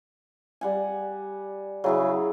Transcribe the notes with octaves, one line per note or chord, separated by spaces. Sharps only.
G3 F#5 G#5
C#3 F#3 E4 G#4